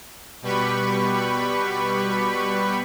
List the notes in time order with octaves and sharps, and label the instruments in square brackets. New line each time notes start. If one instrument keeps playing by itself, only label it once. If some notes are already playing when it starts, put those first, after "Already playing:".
[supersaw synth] B2 G3 G4 B4 B5 C#6